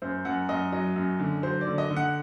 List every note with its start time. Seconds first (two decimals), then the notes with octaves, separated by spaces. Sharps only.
0.02 F#2 C5
0.25 F#2 F#5
0.49 F#2 D#5
0.72 F#3 D#5
0.96 F#2
1.20 D3
1.43 F#3 C5
1.61 D5
1.67 D3
1.78 D#5
1.91 D3
1.96 F#5